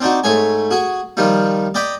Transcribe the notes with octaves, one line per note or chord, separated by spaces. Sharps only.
C4 D4 D#4 F#4
G#2 A3 G#4 C#5 G#5
F#4 G#4
D#3 F3 G3 D#4
D5 D#5 G5 A#5 B5